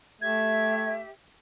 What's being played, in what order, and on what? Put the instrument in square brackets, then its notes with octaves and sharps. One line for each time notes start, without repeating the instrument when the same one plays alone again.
[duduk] A3 [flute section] G4 E5 [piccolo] G#6